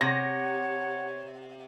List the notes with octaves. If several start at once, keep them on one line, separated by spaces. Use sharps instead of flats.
C3 C#5 F#5 A#6